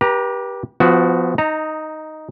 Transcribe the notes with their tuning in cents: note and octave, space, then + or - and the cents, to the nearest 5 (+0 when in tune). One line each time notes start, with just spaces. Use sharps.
G4 +0 B4 -40 A#5 +0
F3 +0 B3 +25 F#4 +0
D#4 +0 A#5 -20